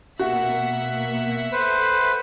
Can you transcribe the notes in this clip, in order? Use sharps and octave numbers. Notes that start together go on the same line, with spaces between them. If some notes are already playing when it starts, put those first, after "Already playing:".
B2 A#3 F#4 E5 F#5 B6
A4 B4 C5